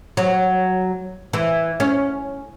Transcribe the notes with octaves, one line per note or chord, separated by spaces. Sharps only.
F#3
E3
C#4